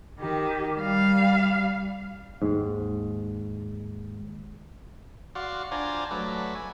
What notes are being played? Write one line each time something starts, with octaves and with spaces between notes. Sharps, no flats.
D#3 G4
G3 F5
D#2 G#2
F#4 D5 F5 C6
D4 F4 C5 D5 G#5 A#5
F#3 A3 B4 D5
G#5